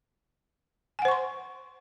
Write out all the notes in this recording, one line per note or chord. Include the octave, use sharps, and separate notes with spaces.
C5 F#5 G#5 C6 C#6